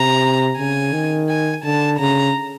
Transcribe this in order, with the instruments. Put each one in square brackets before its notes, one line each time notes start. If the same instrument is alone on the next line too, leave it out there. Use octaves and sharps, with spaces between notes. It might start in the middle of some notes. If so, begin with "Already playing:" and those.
Already playing: [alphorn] C3 [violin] A#5
[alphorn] C#3 [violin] G#5
[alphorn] D#3
[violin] G#5
[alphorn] D3 [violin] A5
[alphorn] C#3 [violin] A#5